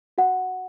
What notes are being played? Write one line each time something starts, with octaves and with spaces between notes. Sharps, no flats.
F#4 F#5